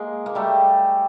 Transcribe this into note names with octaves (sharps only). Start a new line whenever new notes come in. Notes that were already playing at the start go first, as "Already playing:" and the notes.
Already playing: G#3 A#3
A#3
G3 A3